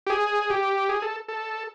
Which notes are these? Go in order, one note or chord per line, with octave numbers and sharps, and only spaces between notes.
G4
G#4
G4
G#4
A4
A4